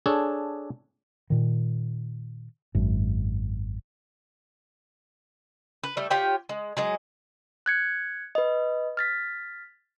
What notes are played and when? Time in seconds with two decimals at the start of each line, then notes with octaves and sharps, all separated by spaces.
0.06 D4 G#4 A4 C#5
1.30 A#2 D#3
2.75 G#1 F#2
5.83 B4
5.97 G3 A3
6.10 F4 G4 C#5 G5
6.49 G#3
6.77 F#3 G#3 G#4
7.66 F#6 G#6 C#7
8.35 B4 D#5
8.97 F6 A6 B6